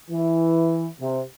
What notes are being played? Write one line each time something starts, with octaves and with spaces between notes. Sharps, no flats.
E3
C3